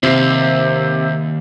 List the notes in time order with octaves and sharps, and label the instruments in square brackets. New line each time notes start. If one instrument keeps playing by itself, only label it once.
[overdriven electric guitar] D#2 [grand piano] C3 C7